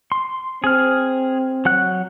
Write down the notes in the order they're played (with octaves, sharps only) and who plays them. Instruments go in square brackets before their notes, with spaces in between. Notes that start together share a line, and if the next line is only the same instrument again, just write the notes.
[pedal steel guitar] C6
[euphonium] C4 [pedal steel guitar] G#4 F6
[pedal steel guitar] F#3 F#5 F#6